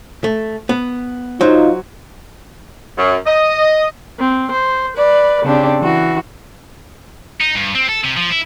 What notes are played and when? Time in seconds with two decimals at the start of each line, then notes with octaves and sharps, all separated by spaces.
0.24 A3
0.69 B3
1.41 F#3 D#4 F4 C5
2.97 F#2
3.26 D#5
4.18 C4
4.51 C5
4.95 B4 D5
5.43 C#3 C4 D4 G4
5.80 E3 F#4
7.41 D#4
7.56 G2
7.75 C4
7.89 A4
8.04 C3
8.17 F3
8.30 E4